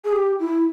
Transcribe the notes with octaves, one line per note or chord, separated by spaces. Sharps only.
G#4
G4
E4